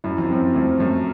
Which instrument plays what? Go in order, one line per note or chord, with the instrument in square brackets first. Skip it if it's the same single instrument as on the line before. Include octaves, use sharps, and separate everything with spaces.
[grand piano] F#2 [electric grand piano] E4
[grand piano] F2
[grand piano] F#2 [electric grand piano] C4
[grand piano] F2 [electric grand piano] A3
[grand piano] F#2 [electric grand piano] A3